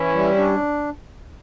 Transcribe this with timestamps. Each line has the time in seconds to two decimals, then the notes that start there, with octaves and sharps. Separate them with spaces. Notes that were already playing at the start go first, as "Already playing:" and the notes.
Already playing: E3 C#4 E4
0.14 G3
0.37 D4